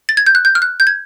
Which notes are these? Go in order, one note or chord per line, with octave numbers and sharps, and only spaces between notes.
A6
G#6
G6
F#6
G6
F6
F#6
G6
G#6